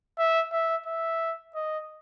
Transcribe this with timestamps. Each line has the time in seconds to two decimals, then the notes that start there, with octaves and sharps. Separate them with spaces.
0.18 E5
0.52 E5
0.86 E5
1.55 D#5